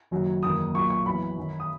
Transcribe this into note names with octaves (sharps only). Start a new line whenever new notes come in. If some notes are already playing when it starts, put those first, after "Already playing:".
F#1 F#2 D#3 F#3
F#1 E2 D#3 A#3 D#6
B1 A#2 F#3 A#3 C#6
C#6
F#2 E3 B3 B5
F#2 D#3 F#3
D#6